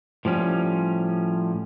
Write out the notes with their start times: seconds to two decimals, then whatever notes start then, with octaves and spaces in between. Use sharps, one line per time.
0.25 A2 F3 G3 C#4